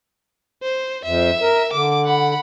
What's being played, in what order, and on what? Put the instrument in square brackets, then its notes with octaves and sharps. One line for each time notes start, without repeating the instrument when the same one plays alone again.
[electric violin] C5
[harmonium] F2 [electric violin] E5
[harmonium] A#4
[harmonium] D3 [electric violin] D6
[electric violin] F#5 B5